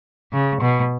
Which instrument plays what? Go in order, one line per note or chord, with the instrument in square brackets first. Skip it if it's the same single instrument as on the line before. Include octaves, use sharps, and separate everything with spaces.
[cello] C#3
B2